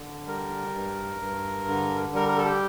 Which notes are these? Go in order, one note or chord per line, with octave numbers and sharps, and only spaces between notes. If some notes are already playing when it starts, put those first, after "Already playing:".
Already playing: D3
G3 A#4
G2
G2
D3
G3 A#4
A#4
A4
G4